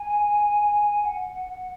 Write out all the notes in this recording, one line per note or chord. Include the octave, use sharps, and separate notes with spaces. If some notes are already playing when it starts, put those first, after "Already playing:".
Already playing: G#5
F#5